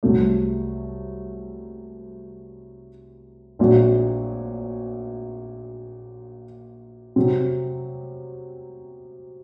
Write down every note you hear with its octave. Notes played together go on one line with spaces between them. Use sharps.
C2 C3 F#3 A3
A#1 A#2 F#3 C4 F#4
C3 F#3 C4